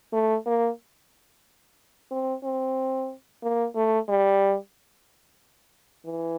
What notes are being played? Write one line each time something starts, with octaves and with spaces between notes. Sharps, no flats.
A3
A#3
C4
C4
A#3
A3
G3
E3